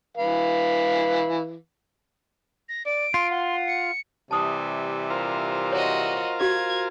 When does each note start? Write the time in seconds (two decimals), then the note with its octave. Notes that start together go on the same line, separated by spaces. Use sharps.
0.17 E3 B4 F5
2.69 A#6
2.86 D5 D7
3.14 F4 C6
3.31 F#5 C6
3.68 C#7
4.31 C3 E3 G3 A5 D#6
5.10 F4 A#4 C5
5.72 F#4 C#5 D#5
6.40 F#4 G4 F5 G#6